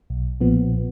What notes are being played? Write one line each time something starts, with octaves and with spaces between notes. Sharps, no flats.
B1
A#2 F3 B3